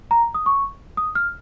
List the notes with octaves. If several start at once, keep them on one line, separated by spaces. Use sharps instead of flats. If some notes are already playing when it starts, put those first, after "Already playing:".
A#5
D#6
C#6
D#6
F6